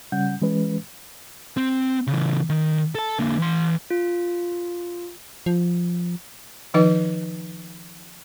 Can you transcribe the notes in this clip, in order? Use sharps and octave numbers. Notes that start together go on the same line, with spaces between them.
C#3 G3 C#4 F#5 G6
E3 G#3 C#4 B4
C4
C#3 E3
D#3
A4 A5
D3 A#3
E3 C6
F4
F3
D#3 F3 D#4 B4 D#5